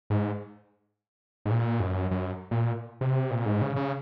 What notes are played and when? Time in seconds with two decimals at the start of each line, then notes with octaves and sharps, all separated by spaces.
0.10 G#2
1.46 G#2
1.51 A#2
1.80 F#2
2.11 F#2
2.51 A#2
3.01 C3
3.31 A#2
3.46 G#2
3.62 C#3
3.76 C#3